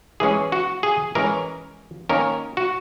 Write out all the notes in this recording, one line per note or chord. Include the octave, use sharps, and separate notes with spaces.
E3 G#3 C#4 G#4
F#4
G#4
E3 G#3 C#4 A#4
D#3 A#3 C#4 A#4
F#4